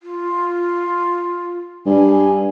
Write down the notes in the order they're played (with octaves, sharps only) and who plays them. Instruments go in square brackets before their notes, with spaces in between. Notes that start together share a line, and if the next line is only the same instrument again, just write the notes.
[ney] F4
[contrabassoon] G2 [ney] G#5